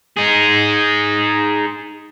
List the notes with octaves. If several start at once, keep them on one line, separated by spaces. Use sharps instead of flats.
D#4 G#4